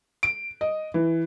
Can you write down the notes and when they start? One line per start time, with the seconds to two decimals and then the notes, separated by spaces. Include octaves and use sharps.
0.23 D7
0.61 D#5
0.94 E3